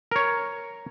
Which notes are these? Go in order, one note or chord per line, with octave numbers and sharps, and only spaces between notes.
A#4 C#5